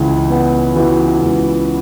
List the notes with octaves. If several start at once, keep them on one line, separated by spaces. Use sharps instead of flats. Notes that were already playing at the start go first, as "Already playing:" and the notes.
Already playing: C#2 C#3 E3
B3
E3 F#4
C#2